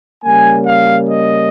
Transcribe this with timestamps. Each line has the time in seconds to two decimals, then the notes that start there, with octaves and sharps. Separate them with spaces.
0.24 C#3 G3 A#3 C#4 G#5
0.67 F5
1.10 D#5